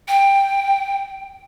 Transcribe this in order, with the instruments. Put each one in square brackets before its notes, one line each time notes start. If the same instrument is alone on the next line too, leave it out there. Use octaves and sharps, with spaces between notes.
[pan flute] G5